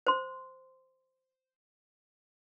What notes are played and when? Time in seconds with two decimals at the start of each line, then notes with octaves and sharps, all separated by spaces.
0.07 C5 C6